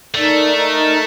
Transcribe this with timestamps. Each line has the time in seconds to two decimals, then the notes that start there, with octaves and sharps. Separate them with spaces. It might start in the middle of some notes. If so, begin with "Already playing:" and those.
0.14 A3 D#4 A#4 D5
0.56 D#4 A#4 D#5